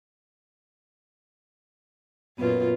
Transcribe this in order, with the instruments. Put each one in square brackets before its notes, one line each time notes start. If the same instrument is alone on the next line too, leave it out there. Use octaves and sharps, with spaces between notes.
[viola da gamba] F#2 A#2 F4 [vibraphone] B3 B4